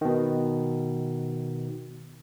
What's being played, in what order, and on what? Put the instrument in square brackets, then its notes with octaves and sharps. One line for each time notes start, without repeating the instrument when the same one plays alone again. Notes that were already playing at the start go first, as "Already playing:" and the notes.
[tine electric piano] B2 D#3